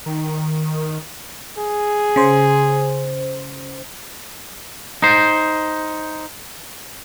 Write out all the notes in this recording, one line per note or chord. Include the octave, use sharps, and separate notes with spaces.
D#3
G#4
C#3 C5
D#4 C5